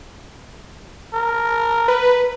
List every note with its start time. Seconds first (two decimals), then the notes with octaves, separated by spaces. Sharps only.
1.13 A#4
1.88 B4